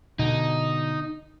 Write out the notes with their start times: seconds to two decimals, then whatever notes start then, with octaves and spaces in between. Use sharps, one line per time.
0.19 B2 D3 D#4